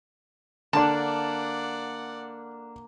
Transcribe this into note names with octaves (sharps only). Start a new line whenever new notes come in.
D3 A#3 D4 D5 F#5 A5